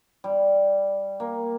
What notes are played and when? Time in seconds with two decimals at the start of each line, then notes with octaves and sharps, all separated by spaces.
0.24 G3
1.20 A#3